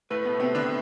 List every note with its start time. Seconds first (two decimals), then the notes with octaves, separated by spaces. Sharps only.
0.10 A2 A3 B4
0.25 B2 B3
0.39 C3 B3 C4
0.54 D3 D4